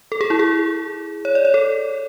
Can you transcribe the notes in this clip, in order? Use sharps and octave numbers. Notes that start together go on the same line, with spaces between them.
A4
G#4
E4
G#4
C#5
D5
C#5
A4